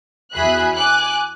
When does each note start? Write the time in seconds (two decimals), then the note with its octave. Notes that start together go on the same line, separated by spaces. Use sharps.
0.34 E2 F#4 G#4 E5 B5 F#6
0.77 G#5 D6 F#6